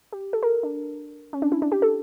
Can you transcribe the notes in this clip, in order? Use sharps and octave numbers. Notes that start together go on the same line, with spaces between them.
G4
A4
A#4
D4
C#4
D4
E4
D4
G4
A4